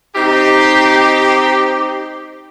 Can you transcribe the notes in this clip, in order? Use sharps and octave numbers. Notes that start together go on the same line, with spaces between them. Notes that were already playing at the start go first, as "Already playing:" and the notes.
C4 D#4 G4